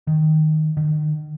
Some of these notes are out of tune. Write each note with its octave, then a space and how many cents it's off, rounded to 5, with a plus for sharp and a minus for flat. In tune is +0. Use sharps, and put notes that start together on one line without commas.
D#3 +0
D#3 -35